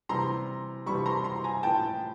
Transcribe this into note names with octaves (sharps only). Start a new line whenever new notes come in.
C3 E3 G3 A#5 C6
C3 E3 G3 B5 C#6
A#5 C6
A#5 C6
G#5 A#5
A2 F3 G5 A5